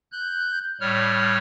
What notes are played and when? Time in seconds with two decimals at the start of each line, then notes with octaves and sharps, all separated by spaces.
0.12 F#6 G6
0.81 A2 G3 C#5 F6